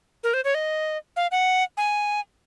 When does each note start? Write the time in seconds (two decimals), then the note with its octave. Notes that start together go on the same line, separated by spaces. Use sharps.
0.23 A#4
0.34 C5
0.44 C#5
0.54 D#5
1.16 F5
1.31 F#5
1.77 G#5